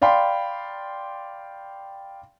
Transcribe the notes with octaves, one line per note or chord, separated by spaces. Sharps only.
D5 F5 G5 B5 C6